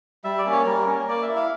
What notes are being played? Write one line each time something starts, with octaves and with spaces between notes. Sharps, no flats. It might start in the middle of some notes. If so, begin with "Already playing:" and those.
G3 E5
D5
A#3 C#4
C#5
G3 A#4
A#3 C#4
A#3 D5
E5
E4
F5